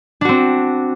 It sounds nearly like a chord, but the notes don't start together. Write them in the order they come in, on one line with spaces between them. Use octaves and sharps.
D4 F#4 C4